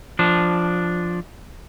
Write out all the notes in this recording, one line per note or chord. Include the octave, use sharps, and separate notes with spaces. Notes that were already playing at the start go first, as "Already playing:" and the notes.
F3 D4